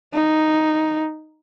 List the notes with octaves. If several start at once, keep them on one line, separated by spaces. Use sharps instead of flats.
D#4